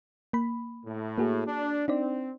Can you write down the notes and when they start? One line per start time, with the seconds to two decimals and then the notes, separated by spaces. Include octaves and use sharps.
0.33 A#3 B5
0.86 A2
1.18 A#3 F#4 G#4
1.47 D4
1.88 C4 D4 D#4 D5